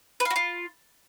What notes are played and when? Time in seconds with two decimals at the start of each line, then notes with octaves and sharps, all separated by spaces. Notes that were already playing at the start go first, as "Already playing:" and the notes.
0.20 B4
0.25 F5
0.31 F#4
0.36 F4